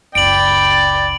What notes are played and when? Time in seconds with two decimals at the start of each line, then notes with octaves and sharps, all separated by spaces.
0.15 F#1 C#2 D5 G5 B5 D7 F#7